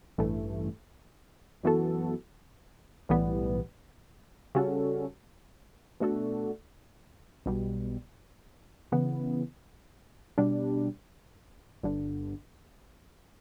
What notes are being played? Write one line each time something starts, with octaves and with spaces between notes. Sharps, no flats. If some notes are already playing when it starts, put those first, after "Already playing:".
A1 G2 E3 A3
F#2 E3 B3 F#4 A4
B1 A2 E3 G3 B3
C#3 G3 C#4 F#4 A4
B2 A3 D4 F#4 A4
B1 B2 G3
C#3 E3 B3
B2 G3 D4
G1 G2 D3